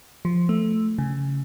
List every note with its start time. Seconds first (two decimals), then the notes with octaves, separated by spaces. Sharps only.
0.25 F3
0.49 A3
0.98 C#3